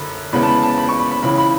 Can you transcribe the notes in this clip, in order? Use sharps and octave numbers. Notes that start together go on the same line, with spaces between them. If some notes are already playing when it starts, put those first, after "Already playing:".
Already playing: F#2 D3 B5
E2 C#3 G#3 B3 B5
A5
B5
A5
B5
C#6
B5
B5
C#2 C#3 E3 B5
B5